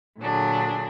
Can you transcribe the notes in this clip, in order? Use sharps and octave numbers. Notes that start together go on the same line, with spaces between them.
A#2 D3 F#3 D4 G#4